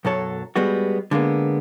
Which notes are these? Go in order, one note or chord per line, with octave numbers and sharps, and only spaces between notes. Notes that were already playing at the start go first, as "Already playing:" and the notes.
B1 F#2 F#3 A4 C#5
G3 G#3 B3 F#4
D3 G#3 A#3 B3